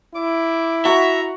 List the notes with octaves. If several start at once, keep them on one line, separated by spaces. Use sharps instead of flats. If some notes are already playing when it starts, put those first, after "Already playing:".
E4 D6
F#4 E5 F#5 A#5